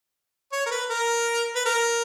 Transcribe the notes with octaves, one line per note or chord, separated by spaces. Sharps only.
C#5
A#4
B4
A#4
B4
A#4